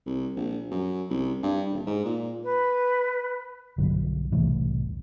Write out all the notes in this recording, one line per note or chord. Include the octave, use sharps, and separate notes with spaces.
C2
A#1
F#2
C2
G2
D#1
G#2
A#2
B4
B1 G2 D3 F#3
E1 C2 A2 E3